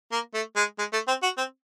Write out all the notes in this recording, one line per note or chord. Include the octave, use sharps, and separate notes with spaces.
A#3
A3
G#3
G#3
A3
C4
F#4
C4